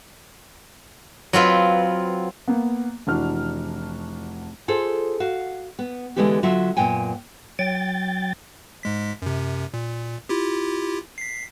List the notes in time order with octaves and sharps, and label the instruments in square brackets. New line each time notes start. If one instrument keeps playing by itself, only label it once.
[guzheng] F#3 C4 F4 B4
[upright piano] A#3 B3
F1 E3 D4 F#4 F6
[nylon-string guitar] F4 G#4 A4 C5
F#4 F5
B3
D3 E3 G#3 A3 B3 G4
D3 F#3 F4 E5
F#2 A#2 B3 G5 G#5
[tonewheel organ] F#3 G5 A6
[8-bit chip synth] G#2 G#3 B6
F#2 C3
A#2
E4 F4 G4
B6 C7